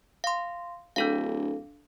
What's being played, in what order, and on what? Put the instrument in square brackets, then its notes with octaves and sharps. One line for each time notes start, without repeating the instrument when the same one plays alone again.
[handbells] F5 C6
[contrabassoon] D1 [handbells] D4 A4 F5